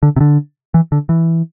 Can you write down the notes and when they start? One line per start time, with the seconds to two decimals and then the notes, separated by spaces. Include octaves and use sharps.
0.03 D3
0.16 C3
0.20 D3
0.74 E3
0.92 D3
1.09 E3